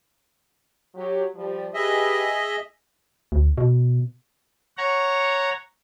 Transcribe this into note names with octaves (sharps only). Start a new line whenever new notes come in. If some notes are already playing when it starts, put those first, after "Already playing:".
F#3 G4
F3 G3
G4 G#4 B4 D#5 E5
D2
B2
C#5 F#5 A#5